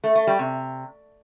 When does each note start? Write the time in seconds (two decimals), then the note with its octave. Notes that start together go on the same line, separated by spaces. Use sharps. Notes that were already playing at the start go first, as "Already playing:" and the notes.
0.04 A3
0.15 A3
0.27 G3
0.39 C3